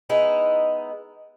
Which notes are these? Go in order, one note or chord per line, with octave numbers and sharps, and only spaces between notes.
G#3 B3 D#4 E4